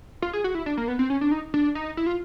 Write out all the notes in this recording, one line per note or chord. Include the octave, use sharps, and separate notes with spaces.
F4
G#4
F#4
E4
D4
A#3
B3
C4
C#4
D4
D#4
D4
D#4
E4
F4